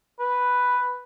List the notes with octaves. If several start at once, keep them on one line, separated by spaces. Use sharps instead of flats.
B4